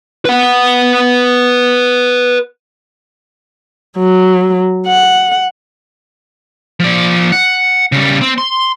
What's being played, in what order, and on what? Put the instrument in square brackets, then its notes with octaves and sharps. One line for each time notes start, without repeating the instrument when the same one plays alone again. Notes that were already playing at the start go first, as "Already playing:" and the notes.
[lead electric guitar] B4 F#5
[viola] F#3
F#5
[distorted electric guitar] F3 D5
F#5
C#3 G3
C4
C6